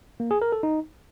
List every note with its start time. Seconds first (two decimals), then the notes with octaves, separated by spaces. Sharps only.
0.20 A#3
0.31 G#4
0.42 A#4
0.52 A4
0.63 D#4